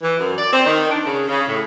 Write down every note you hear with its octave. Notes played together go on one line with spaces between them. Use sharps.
E3
F#2
D5
C4
D#3
D4
C#3
C#3
A2